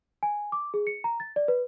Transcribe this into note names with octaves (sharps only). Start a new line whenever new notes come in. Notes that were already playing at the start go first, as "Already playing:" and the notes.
G#5
D6
G#4
C#7
A#5
A6
D5
B4